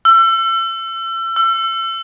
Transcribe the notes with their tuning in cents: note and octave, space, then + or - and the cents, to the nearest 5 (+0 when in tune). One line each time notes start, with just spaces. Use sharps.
E6 +35
E6 +35